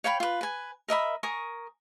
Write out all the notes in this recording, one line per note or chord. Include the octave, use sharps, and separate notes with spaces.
C#5 F5 G5 B5
F4 B4
B4 G#5
A#4 D#5 E5 B5
A#4 G#5 C#6 D#6